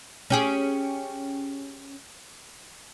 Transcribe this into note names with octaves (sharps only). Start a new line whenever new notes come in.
C#4 G4 G#4